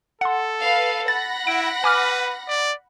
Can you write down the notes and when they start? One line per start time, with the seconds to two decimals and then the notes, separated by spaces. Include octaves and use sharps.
0.21 A4 F#5 C6
0.62 B4 F5
1.08 F#5 B5 A6 A#6
1.47 E4 D7
1.84 B4 G#5 D6 F6
2.48 D5